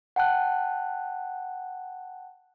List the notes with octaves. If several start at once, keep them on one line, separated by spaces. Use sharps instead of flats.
F#5 G5 A5 F#6